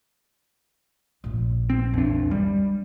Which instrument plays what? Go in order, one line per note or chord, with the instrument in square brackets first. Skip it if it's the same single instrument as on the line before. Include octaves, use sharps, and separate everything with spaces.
[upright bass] A#1 A#2
[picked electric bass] C4
E2 D4
[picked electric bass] G3 [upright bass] G#3